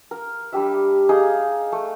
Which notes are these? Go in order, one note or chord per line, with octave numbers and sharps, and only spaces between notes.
A#4
G3 D4 G4 E5
D#4 G#4 D#5 F5
A3